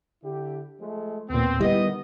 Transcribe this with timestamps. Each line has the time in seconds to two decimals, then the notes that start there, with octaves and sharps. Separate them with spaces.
0.23 D3 E4 G4
0.79 F3 G#3 A3
1.30 D#2 A#2 B3 C4
1.61 B2 D3 D#3 G3 B3 E4 D#5